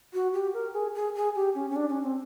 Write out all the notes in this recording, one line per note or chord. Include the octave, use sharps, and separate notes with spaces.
F#4
G4
A#4
G#4
G#4
G#4
G4
C#4
C#4
D4
C#4
C4